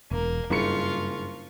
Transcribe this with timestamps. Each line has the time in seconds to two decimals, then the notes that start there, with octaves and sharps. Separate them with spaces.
0.11 E1 A#3
0.50 F#1 G2 F4 C#6 C#7